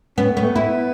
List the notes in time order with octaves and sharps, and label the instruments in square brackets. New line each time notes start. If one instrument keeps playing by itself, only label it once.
[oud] B3 [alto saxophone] C#4
[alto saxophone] A3
[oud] B3
[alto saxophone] A3
[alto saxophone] B3 [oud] E4